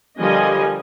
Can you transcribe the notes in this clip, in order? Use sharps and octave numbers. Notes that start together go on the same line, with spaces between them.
D3 F3 G3 A#4 D#5 G#5